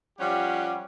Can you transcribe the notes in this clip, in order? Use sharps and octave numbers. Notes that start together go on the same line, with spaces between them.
F3 G3 C#4 G4 F#5